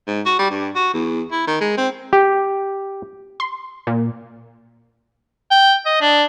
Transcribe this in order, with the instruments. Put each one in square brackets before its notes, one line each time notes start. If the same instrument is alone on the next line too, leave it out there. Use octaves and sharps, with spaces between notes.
[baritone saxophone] G#2
F#4
G3
G2
F#4
E2
E4
D#3
G#3
C4
[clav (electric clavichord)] G4
[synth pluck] C6
A#2
[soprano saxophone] G5
D#5
D4